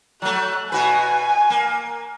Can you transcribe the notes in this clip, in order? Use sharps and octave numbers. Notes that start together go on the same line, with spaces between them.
F#3 A3 F#6
B2 F#4 B4 G#5
A#3